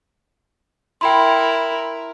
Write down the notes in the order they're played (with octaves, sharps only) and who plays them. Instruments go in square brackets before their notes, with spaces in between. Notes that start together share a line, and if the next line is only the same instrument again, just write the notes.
[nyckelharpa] E4 A#4 [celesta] G5 B5 C6